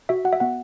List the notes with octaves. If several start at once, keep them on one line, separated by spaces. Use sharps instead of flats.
F#4 E5
F#4 F#5
E5
B3 F#5